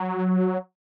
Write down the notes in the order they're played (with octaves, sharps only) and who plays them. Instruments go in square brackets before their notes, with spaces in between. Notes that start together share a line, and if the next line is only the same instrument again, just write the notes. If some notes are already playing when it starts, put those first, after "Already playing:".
Already playing: [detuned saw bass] F#3